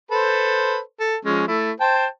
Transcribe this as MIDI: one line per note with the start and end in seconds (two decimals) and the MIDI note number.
0.11 0.79 69
0.11 0.79 71
0.11 0.79 72
1.00 1.16 69
1.25 1.47 53
1.25 1.47 56
1.25 1.47 61
1.48 1.71 57
1.48 1.71 64
1.80 2.06 72
1.80 2.06 79
1.80 2.06 81